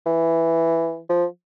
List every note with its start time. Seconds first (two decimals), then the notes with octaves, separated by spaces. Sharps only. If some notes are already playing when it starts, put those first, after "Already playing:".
0.06 E3
1.09 F3